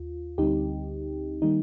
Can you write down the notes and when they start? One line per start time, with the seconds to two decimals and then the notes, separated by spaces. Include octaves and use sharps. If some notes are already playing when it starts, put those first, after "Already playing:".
Already playing: D#2 F4
0.38 D2 D3 G3 C4 D#4 G4
1.42 D#3 G3 A#3 D#4